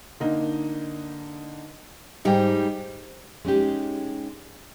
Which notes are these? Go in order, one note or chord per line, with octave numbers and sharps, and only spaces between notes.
D3 A#3 D#4
G#2 G3 D#4 D#5 G5
G#3 C#4 D#4 G4